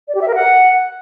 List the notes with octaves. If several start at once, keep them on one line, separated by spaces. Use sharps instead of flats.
D5
G4
E5
A#4
F#5